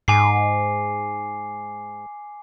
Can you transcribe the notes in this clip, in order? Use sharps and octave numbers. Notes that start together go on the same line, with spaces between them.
G#2 G#5 D6 C7